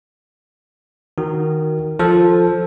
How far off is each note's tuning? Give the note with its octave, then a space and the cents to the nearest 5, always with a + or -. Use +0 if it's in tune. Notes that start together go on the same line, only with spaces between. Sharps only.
D#3 +0 F#4 +5
F3 +5 A4 +0